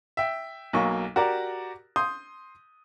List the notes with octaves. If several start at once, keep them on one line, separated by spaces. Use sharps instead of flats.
E5 G5
B1 F#3 A#3 C#6
F#4 G4 A#4 D5 A#5
C6 D#6 G6